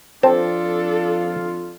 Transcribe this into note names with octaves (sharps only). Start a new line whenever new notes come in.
F2 C4 D4 F4 A4 A5